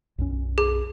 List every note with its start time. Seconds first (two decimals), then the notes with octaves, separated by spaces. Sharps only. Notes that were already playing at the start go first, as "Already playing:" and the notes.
0.18 B1 F#2 C#4
0.58 G#4